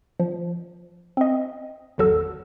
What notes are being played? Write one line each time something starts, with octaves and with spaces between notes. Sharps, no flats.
F3
C4 D#5
G#1 E2 F#3 F#4 A4 E6